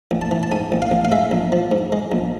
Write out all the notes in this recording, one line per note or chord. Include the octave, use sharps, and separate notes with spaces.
A1
A5
E3
A5
G#2 G#5
A1
F5
A1
F5
G#3 E5
A#1
F3
G#2
G#3
A#1